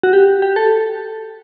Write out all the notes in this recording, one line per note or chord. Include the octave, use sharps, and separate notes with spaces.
F#4
G4
G4
A4